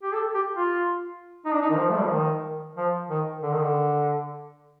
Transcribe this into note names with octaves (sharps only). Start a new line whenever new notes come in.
G4
A4
G4
F4
D#4
D4
D#4
D#3
F3
A3
G3
F3
D#3
F3
D#3
D3
D#3
D3